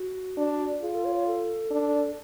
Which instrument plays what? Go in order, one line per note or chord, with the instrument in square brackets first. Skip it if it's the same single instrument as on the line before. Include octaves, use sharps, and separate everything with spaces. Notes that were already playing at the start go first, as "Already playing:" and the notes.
Already playing: [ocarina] F#4
[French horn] D4
[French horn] F4 [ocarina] G#4
[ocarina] A4
C#5
C#5
A4
[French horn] D4